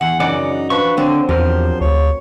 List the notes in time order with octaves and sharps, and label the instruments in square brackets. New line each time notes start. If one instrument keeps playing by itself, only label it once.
[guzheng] E2 [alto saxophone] F#5
[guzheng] F#2 [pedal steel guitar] C#3 D5 F#5 [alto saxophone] D#4
[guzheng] F3 D4 [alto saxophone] B4 [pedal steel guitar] C#6
[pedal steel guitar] D3 [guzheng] F#3 C4 D5 [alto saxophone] C5
[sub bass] E2 [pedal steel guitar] F3 G4 F6 [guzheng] A#4 [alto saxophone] C5
[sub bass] D2 [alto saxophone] C#5